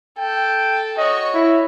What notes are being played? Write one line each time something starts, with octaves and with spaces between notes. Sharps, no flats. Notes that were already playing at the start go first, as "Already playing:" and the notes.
A4 G5
F#4 C#5 D#5
E4